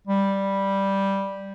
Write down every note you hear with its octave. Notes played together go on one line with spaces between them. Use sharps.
G3